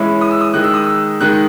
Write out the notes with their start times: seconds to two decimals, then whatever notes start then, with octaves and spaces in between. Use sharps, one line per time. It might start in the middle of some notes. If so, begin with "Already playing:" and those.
Already playing: E3 G#3 C#4 E4
0.21 D#6
0.31 E6
0.41 D#6
0.54 D#3 G#3 D#4 F#6
0.64 E6
0.74 D#6
0.84 E6
1.20 D#3 G#3 D#4 F#6